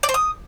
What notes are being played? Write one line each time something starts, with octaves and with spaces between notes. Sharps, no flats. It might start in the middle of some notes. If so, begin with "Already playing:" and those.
D5
C5
D#6